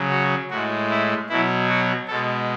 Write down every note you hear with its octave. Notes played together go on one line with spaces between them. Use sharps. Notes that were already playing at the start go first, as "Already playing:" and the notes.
Already playing: C#3 F#3
F#4
A2 G#3 F#4
E4
B2 F#3 E4
F#4
B2 G#3 A4